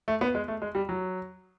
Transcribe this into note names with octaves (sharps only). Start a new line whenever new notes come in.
A3
B3
G#3
A3
G#3
G3
F#3